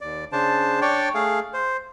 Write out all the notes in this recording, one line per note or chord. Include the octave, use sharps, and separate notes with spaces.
D#2 D5
C#3 D4 C5 A5
D4 C#5 D5 G5
A3 G#4 F5
C5